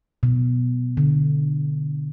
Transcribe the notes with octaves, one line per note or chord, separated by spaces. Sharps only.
B2
D3